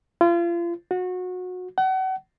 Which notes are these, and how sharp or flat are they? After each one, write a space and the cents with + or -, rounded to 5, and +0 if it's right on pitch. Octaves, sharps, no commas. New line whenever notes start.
F4 -35
F#4 -25
F#5 +35